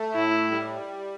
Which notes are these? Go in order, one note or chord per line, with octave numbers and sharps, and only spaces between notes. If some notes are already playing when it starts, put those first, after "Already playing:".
Already playing: A3
A2 E4
G3